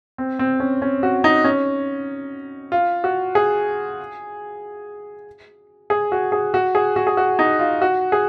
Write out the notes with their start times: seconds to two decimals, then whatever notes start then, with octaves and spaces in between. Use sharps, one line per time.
0.18 C4
0.39 C4
0.60 C#4
0.82 C#4
1.03 F#4
1.24 D#4
1.44 C#4
2.72 F4
3.04 F#4
3.35 G#4
5.90 G#4
6.12 F#4
6.32 G#4
6.54 F#4
6.75 G#4
6.96 F#4
7.07 G#4
7.17 F#4
7.39 D#4
7.59 F4
7.82 F#4
8.12 G#4